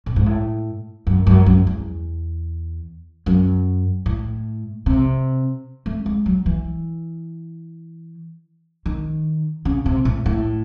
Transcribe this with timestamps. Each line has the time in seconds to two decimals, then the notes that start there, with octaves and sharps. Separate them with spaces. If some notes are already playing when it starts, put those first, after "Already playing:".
0.06 A2
0.16 G#2
0.26 A2
1.07 F#2
1.27 F#2
1.46 F#2
1.67 E2
3.26 F#2
4.06 A2
4.86 C3
5.86 A3
6.06 G#3
6.26 F#3
6.46 E3
8.86 D#3
9.65 C#3
9.86 C3
10.05 A2
10.26 A2